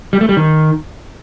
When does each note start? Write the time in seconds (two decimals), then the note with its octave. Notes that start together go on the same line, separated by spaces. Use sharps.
0.13 G3
0.21 A3
0.29 G3
0.37 D#3